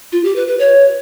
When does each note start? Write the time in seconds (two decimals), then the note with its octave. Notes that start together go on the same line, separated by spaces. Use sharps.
0.12 F4
0.24 G4
0.36 B4
0.48 B4
0.59 C#5